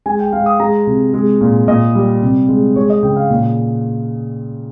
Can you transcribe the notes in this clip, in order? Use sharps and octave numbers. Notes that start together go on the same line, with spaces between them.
G#3 G#5
G5
G#3 F5
D#6
G#3 A#5
C3
G#3
A#2
A#2 D#5
G3
C3
G#3
G#3 C#5
D#5
C#3 G5
F5
A#2